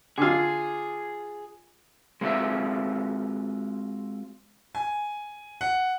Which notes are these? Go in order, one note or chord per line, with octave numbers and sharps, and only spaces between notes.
D3 F4 G#4
G#3 C4 F4 F#4 A4 E5
G#5
F#5